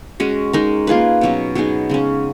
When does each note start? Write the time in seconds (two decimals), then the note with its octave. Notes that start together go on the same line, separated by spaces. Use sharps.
0.20 G#3 C#4 F#4
0.53 G#3 D#4 A#4
0.87 A#3 F4 G#4 B4
1.21 B2 F#3 C#4
1.55 F#3 B3 D#4 G#4
1.90 C#3 G#3 C#4